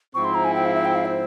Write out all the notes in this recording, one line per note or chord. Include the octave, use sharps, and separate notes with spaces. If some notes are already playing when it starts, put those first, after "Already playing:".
G#2 F3 C4 E4 C#6
C6
A#5
G#5
G5
F5
E5
G5
F5
C5